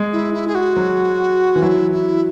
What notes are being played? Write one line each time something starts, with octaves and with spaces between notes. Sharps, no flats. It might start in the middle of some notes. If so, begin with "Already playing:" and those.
Already playing: G#3
E4
E4
G#4
F#4
F#3
E3
F#3 E4
E4